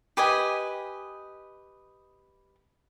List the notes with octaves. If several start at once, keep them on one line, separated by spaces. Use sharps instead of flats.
G4 B4 D#5 G#5